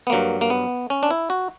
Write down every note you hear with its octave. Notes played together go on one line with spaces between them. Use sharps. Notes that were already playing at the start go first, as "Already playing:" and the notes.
B3
G2 F#3 A#3
A#3
B3
C#4
D4
E4
F#4